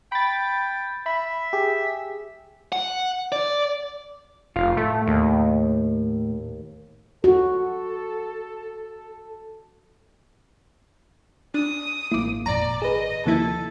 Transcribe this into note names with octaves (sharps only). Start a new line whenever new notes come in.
G5 B5 A6
E5 B5
G4 G#4
F#5
D5
F1 F4
A2 A3
D#2
F#4 A4
D4 D#6
G#1 A#3 E4 D6
F2 A#2 D5 A#5
G#4 B4 D#5
D#2 C3 F3 A#3 E4 A4